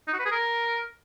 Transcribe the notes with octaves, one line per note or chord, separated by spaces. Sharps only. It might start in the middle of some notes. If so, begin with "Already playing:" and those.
D#4
F#4
B4
G#4
A#4